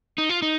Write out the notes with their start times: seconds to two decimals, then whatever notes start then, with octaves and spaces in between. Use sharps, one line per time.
0.18 D#4
0.29 F4
0.42 D#4